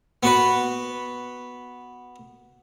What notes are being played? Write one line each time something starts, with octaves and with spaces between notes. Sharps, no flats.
B3 F#4 B4